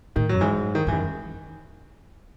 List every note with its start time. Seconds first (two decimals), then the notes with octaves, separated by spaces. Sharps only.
0.16 A2 D#3
0.29 F#2 F#3
0.41 G#2 E3
0.75 D#3
0.87 G#2 E3
0.92 F#2 D#3